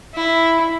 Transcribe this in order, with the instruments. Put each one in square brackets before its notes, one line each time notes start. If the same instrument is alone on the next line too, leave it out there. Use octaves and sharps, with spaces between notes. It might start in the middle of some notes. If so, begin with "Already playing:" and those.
[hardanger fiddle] E4